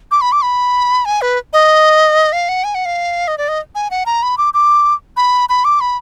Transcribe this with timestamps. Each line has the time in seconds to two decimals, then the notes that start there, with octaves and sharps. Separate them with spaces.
0.11 D6
0.21 B5
0.32 D6
0.43 B5
1.05 G#5
1.22 B4
1.53 D#5
2.33 F5
2.49 F#5
2.64 G#5
2.75 F#5
2.85 F5
3.28 D#5
3.38 D5
3.48 D#5
3.75 G#5
3.91 F#5
4.06 A#5
4.23 B5
4.38 D6
4.54 D6
5.17 B5
5.49 B5
5.65 D6
5.81 B5